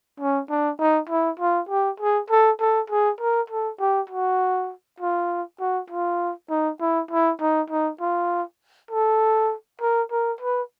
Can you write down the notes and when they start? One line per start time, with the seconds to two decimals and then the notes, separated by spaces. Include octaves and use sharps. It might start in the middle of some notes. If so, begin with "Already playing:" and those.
0.20 C#4
0.50 D4
0.79 D#4
1.09 E4
1.40 F4
1.69 G4
2.00 G#4
2.30 A4
2.60 A4
2.90 G#4
3.20 A#4
3.50 A4
3.80 G4
4.10 F#4
5.00 F4
5.60 F#4
5.90 F4
6.50 D#4
6.80 E4
7.11 E4
7.41 D#4
7.70 D#4
8.00 F4
8.91 A4
9.81 A#4
10.11 A#4
10.41 B4